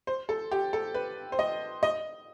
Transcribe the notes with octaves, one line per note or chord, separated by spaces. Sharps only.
C5
A4
G4
A4
B4
C5
D#5
D#5